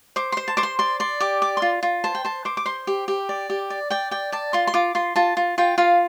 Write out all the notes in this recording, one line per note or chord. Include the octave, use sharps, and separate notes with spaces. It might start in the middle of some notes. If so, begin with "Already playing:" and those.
C5 D6
C5 C6
A5
C5 D6
C6
D5 C6
D5 C6
G4 D6
D5 D6
C6
F4
F4
C5 A5
G5
C5 A5
C5 D6
D6
C5 C6
G4
G4
D5
G4
D5
D5 G5
D5 G5
D5 A5
F4 C6
C6
F4 D6
F4 C6
F4 A5
F4
F4 G5
F4 F5